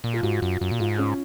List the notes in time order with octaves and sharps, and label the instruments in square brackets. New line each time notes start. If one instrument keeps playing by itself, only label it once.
[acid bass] A#2
[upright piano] F4
[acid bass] G#2 [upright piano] F#4
[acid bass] F#2
F#2
A#2
[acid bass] G#2 [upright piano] F4
[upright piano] C#4